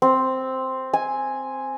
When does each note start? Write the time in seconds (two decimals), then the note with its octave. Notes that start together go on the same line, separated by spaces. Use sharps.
0.02 C4
0.93 G#5